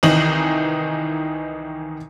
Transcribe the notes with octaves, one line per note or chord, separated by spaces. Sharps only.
C2 D#3 E3 D#4 F#7